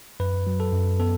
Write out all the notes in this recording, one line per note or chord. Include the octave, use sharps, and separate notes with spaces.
F#2 B4
F#3
A4
F#2
B3 A4